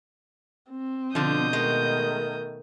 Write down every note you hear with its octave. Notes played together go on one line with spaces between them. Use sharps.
C4
B2 D3 F3 D#6 G6
D#3 G#3 A3